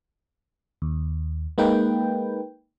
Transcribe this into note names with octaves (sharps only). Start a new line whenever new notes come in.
D#2
G#3 A#3 D#4 B4 G5